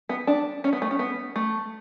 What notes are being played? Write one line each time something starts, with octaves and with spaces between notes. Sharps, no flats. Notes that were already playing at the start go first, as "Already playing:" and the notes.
B3
D4
C#4
B3
A3
C#4
B3
A3